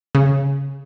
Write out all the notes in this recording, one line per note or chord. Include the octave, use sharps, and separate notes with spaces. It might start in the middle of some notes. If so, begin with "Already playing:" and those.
C#3